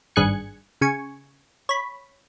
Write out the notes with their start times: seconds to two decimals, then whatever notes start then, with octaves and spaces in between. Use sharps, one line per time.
0.16 G#1 G2 G#4 F#6 G#6 C#7
0.81 C#3 G#5 C#6
1.69 C#5 B5